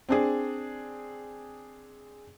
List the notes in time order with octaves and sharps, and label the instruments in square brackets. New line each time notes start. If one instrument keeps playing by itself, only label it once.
[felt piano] C4 D4 G#4